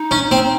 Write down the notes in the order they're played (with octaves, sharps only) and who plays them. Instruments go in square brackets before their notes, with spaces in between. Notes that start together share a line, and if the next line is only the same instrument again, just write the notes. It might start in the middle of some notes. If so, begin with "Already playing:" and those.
Already playing: [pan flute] D#4
[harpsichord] C#4
C4